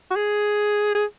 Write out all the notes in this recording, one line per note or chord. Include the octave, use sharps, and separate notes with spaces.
F#4
G#4
G#4